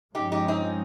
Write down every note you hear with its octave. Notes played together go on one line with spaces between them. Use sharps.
G2 F3 G#3 C#4 D#4 G4
D#4 G4
C4 D#4